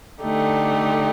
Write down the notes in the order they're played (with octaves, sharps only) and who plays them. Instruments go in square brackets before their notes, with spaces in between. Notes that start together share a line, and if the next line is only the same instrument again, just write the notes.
[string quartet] D3 A3 D#4 G4